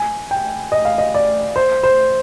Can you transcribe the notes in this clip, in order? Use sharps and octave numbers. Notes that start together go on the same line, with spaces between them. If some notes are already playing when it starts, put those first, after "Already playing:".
Already playing: G#5
G5
D#5
F5
D#5
D5
C5
C5